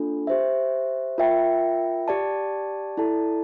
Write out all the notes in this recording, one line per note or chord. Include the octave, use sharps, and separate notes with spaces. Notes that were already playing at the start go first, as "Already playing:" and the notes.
Already playing: A#3 D4 F4 A4
G4 C5 E5
F4 A#4 E5 G5
G4 D5 A5
E4 A4 D5 A5